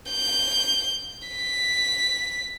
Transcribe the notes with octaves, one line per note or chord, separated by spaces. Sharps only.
G6
B6